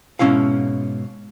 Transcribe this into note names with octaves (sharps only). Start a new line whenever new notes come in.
G#2 B2 E3 C#4 E4 F5